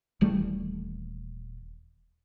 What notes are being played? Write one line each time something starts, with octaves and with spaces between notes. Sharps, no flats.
D#1 E3 G3 A3